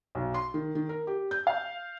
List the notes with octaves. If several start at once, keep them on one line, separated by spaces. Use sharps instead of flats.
B1
C6
D#3
D#3
A#4
G4
G6
F5